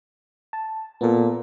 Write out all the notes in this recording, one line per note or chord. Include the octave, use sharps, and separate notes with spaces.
A5
A#2 B3 A4